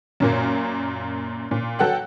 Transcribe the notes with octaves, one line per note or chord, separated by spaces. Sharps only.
F#2 A#2 A#3
A#2
F#3 A4 F#5 G5 F#6